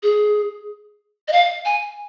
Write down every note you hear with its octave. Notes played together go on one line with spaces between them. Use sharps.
G#4
D#5
F5
G#5